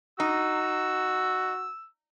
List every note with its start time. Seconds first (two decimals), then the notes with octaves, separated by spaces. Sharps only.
0.20 D#4 F#4 E6